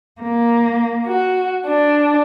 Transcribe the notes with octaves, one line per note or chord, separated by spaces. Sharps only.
A#3
F#4
D4